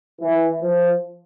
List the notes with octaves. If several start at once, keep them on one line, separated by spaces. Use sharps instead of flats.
E3
F3